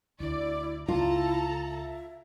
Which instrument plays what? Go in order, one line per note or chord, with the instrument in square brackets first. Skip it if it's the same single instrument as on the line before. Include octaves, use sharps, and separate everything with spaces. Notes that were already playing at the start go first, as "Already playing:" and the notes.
[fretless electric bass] D2 [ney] E4 [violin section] D5
[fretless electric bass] C#2 [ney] E4 [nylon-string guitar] F4 [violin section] A4 A5 A#5
[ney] E5